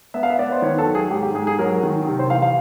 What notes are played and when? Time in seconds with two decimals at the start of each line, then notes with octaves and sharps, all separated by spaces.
0.14 B3 E5
0.23 F5
0.30 E5
0.39 B3 D5
0.52 C5
0.62 D#3 C#5
0.78 A4
0.86 F#3
0.95 G#4
1.10 G#2 G4
1.23 G4
1.34 G#2 G#4
1.47 G#4
1.59 F#3 A#4
1.83 D#3
2.07 C3
2.19 C5
2.30 E3 F5
2.42 F5